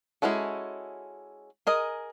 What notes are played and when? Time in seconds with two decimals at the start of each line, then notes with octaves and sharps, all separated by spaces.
0.22 G#3 C#4 E4 F#4 A4
1.67 G#4 A#4 D#5